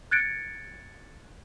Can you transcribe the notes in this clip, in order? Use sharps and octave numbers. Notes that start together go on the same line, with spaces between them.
F#6 G#6 A6 C#7 D7